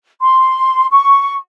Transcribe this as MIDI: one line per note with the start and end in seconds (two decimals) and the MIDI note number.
0.20 0.86 84
0.91 1.33 85